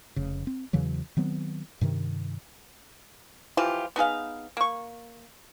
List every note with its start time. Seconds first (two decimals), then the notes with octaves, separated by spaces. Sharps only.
0.16 F1 C#3
0.47 C4
0.73 E2 C#3 E3 F#3
1.17 D#3 F#3 B3 C4
1.81 G2 C3 D#3
3.57 E3 F3 F4 G4
3.96 B3 D#4 G#4 F5
4.57 A#3 C#6